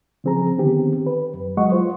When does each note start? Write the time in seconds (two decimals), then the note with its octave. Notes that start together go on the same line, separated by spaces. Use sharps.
0.24 C#3 F3 C4 G#4 A#5
0.58 D3 D#3 B3 C4 G4
1.07 B4
1.34 F#2
1.57 F#3 G#3 D#5 F#5 C#6
1.72 F4 C5